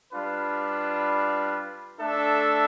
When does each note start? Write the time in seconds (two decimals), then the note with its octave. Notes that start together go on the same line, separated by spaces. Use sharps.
0.13 G3 D4 F4 B4
2.01 A3 D4 A4 E5